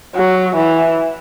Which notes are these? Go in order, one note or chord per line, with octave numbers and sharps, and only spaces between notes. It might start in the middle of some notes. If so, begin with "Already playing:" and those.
F#3
E3